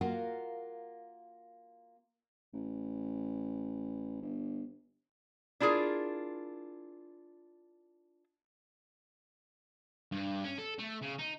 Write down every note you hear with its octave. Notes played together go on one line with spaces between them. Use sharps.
A#3 F4 F#4 A#4 F5 F#5
A1
G1
D4 E4 F4 G#4 A#4
G2
C#4
A4
A3
C#3
D#4